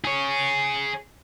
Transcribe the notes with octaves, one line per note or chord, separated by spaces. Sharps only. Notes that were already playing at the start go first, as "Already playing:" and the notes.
G#4 C#5